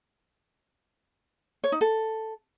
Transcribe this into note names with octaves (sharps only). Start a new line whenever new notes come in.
C#5
D#4
A4